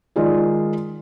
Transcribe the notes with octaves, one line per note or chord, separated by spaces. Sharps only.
D#3 G#3 F4 G#4 D5